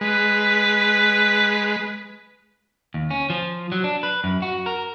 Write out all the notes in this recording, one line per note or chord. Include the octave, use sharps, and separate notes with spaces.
G#3 B4
D#2
C#4
F3
F#3
D4
B4
F#2
F#4
A#4